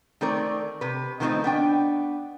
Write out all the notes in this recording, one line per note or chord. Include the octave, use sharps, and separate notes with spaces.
D#3 A3 C4 A#4 D5
C3 B4
D#3 F3 A3 B3 C4 D#4
B3 D4 G5